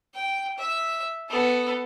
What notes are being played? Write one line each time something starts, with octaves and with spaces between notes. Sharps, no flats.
G5
E5
B3 A4